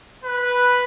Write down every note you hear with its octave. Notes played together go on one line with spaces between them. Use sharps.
B4